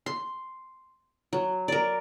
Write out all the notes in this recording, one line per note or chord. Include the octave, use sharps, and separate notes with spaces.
C6
F#3
A#4 D5